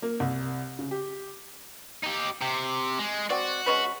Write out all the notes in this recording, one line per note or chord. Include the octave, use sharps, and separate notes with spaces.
A#3
C2
C#3
G4
D#4 G4
C3 G4
G#3
C4 F#4 D5
G#3 C#4 B4